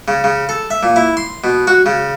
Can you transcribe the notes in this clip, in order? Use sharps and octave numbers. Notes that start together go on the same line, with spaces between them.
C#3
C#3
A4
E5
A#2
E4
C6
B2
F#4
C#3